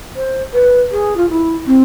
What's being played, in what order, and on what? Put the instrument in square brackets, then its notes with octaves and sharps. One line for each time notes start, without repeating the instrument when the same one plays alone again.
[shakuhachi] C5
B4
G#4
F4
E4
C4